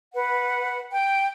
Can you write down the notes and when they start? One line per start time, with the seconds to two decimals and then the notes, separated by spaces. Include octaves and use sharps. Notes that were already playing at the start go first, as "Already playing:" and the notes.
0.14 B4 F#5
0.92 G5